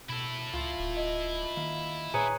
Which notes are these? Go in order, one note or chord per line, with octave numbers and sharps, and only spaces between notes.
B2 E4 A4
C#2 F4
D1
D#5
D#3 A#3
A#2 G#4 B4 C#5 G#5 A#5